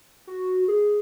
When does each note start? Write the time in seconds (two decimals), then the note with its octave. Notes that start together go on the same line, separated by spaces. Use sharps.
0.27 F#4
0.68 G#4